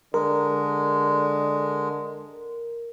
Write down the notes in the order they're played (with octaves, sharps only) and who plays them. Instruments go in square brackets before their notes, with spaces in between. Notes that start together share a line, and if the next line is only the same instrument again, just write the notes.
[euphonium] D3 [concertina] G#3 [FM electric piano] A#4